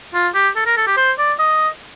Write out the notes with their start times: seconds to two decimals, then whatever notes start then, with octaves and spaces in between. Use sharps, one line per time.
0.14 F4
0.34 G4
0.56 A4
0.66 A#4
0.77 A4
0.87 G4
0.97 C5
1.18 D5
1.39 D#5